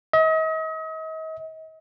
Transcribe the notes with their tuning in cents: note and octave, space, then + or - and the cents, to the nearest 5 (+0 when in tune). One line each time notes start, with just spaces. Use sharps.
D#5 +40